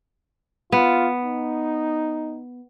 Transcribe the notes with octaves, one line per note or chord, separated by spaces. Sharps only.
B3 F4
D#4